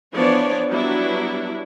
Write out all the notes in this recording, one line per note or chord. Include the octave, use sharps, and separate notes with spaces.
E3 F3 B3 D4 C#5 D5
F#3 G3 B3 D4 E4 F#4